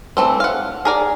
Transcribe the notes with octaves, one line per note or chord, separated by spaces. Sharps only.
E3 A3 C4
F5 F#5
G#4 A#4 D5